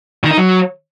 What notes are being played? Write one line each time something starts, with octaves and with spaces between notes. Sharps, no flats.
D#3
D#4
F#3